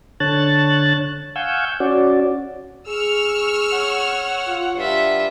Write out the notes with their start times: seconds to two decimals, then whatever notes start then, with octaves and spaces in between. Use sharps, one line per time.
0.20 D3 C#5 A5 F#6 A6
1.36 F5 F#5 G#5 C#6 E6 G6
1.80 C#4 F#4 D5
2.88 G#4 C#6 E6 F6
3.72 C#5 F#5
4.47 F4
4.77 G2 F4 E5